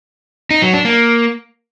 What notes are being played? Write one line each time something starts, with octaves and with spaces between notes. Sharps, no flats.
D#4
F#3
D4
A#3